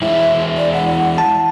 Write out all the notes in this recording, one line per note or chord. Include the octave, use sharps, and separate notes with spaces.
E3 G#3 E4 E5
D5
F#5
A5